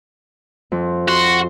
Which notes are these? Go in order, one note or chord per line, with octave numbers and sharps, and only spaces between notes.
F2
F#4 C6